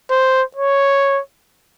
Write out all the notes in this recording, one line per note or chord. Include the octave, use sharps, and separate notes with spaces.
C5
C#5